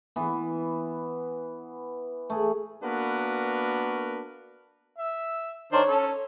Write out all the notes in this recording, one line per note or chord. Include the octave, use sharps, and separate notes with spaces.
E3 B3
A3 G#4
A#3 B3 D4 F#4 A#4 B4
E5
D#3 D4 C5 C#5
C#4 A4
C#5